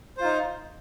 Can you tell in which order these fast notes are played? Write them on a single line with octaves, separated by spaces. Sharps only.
C5 F4 D#4